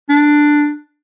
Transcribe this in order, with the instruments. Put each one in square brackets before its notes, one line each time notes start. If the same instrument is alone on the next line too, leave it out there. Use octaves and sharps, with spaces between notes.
[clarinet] D4